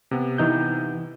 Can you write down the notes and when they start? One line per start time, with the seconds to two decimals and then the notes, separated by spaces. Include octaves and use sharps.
0.11 C3 B3
0.38 E3 D#4 G6